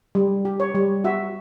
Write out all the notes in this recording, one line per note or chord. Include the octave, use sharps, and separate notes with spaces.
G3
G4
C#5
G3
F#4 E5